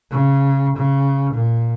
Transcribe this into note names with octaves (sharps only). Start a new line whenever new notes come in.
C#3
C#3
A#2